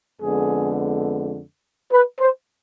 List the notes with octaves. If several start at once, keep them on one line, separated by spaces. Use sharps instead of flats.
F2 D3 G#3 B3 G#4
B4
C5